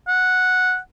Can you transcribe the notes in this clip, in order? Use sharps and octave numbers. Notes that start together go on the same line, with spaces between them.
F#5